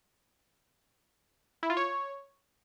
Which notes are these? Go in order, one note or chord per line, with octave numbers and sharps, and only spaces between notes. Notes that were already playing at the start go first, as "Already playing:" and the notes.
E4
F4
C#5